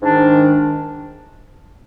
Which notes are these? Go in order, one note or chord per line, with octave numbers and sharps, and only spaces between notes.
G#2 D#3 D4